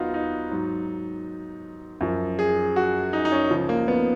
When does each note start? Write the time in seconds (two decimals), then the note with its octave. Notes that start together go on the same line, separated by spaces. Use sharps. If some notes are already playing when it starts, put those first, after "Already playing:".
Already playing: D#2 D#3 F#3 B3 D#4 F4 F#4
0.14 D#4
0.51 G#2 F#3
2.01 F#2 F3
2.39 G#4
2.76 F#4
3.13 D#4
3.25 D#4
3.32 C#4
3.51 C#2 C#3 F3
3.69 A#3
3.88 B3